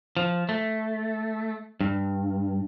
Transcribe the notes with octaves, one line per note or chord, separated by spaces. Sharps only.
F3
A3
G2